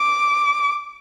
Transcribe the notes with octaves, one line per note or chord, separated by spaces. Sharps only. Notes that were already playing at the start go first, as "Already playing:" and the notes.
Already playing: D6